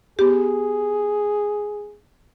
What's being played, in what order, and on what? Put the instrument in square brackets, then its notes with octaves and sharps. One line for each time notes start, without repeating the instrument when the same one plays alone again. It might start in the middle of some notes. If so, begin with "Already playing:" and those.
[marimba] B3 G4 [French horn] G#4